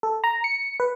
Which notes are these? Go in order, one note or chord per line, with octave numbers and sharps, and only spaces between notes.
A4
A#5
C#7
B4